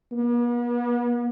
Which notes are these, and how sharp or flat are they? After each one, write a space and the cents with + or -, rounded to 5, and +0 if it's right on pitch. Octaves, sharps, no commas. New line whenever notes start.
B3 -45